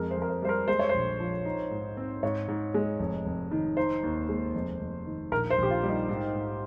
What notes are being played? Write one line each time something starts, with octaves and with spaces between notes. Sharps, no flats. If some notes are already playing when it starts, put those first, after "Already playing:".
Already playing: F2 G#3 G#4 A#4
C5
F2
A#4
C5
G3 C5
A#4
G#3 C5
C#5
A#1 C5
F3
D#4
G#2
C4
G#2 C#5
G#2
G#3
F1
F1
D#3
D#4 C5
D#2
G#3
F1
F1
D#3
A#1 A#4
C5
A#1
G4
F4
G3
D#4
G#2
G#2